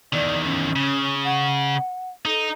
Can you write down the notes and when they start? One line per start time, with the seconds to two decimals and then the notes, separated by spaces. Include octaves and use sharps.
0.13 E2 D#3 D5
0.45 C#4
0.76 C#3
1.24 F#5
2.25 D#4 A4